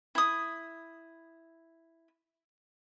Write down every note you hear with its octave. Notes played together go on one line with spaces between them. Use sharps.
E4 D#6